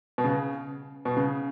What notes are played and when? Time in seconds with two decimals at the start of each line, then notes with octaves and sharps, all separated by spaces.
0.18 B2
0.24 C#3
1.05 B2
1.17 C#3